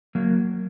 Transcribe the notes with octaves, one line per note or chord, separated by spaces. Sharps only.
F#3 A#3